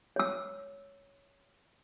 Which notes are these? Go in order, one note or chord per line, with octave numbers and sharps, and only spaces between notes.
C#5 E6